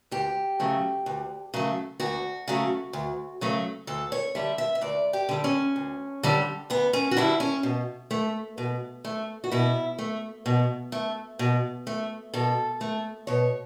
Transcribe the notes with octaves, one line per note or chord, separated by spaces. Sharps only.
D2 G4
C#3 F#3 A3
D2
C#3 F#3 A3
D2 F#4
C#3 F#3 A3
D2
C#3 F#3 A3
D2 A4
C#5
D3 G3 E5
E5
E5
D2 D5
G4
D3 G3
C#4
D2
D3 G3
D2 B3
C#4
F#4
D3 G3 E4
C#4
B2
A3
B2
A3
F#4
B2 E4
A3
B2
A3
B2
A3
B2 A4
A3
B2 C#5